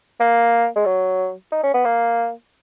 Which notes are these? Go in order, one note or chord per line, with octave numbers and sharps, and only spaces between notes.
A#3
G#3
F#3
D#4
C#4
B3
A#3